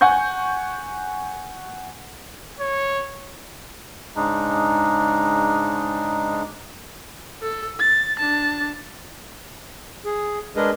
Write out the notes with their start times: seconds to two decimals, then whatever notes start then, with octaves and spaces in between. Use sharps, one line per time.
0.01 F#5 G#5 C#6 G6
2.60 C#5
4.16 G#2 C#3 G#3 D4 D#4
7.42 A4
7.79 A6
8.19 D4 A5
10.05 G#4
10.56 G#3 D4 G#4 A#4 B4 D#5